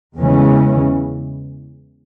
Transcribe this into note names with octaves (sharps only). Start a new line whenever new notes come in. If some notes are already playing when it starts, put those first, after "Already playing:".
E2 C#3 E3 G#3 C#4